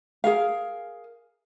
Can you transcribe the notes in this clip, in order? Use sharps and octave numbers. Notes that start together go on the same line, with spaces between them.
G#4 A#4 F5